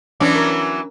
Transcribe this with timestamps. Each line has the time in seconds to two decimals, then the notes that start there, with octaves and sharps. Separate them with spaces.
0.20 E3 F#3 B3 C#4 D4 D6
0.36 A#4